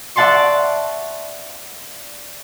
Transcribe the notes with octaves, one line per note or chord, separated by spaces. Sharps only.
D5 E5 F#5 A5 C6 C#6